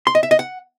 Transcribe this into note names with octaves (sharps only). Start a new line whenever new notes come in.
C6
D#5
E5
D#5
F#5